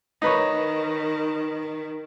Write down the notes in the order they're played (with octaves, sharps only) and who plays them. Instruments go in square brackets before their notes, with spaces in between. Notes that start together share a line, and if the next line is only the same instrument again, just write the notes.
[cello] D#3 [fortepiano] D#4 B4 C#5